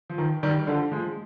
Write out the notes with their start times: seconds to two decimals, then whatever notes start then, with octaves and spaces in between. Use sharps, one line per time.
0.10 F3
0.18 D#3
0.43 D#3 G3
0.67 D3 F3
0.91 F3 G#3